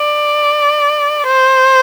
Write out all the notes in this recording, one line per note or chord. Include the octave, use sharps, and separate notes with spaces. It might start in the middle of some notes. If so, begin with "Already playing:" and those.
Already playing: D5
C5